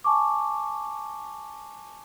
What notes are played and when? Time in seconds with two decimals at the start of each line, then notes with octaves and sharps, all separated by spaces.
0.04 G#5 A5 C#6 D6